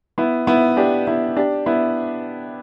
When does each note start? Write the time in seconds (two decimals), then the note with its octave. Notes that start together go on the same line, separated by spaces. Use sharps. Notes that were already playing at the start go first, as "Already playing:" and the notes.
0.18 B3 E4
0.47 B3 E4
0.77 D4 G4
1.07 B3 E4
1.37 D4 G4
1.66 B3 E4